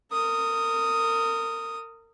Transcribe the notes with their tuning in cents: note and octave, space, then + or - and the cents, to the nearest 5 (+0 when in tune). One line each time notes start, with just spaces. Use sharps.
A#4 -30 D#6 +0